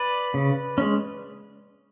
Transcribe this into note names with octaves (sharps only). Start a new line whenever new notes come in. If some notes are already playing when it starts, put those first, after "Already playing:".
Already playing: B4 D5
C#3
G#3 C#4